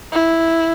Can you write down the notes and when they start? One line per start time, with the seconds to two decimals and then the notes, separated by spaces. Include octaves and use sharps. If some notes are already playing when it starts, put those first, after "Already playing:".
0.12 E4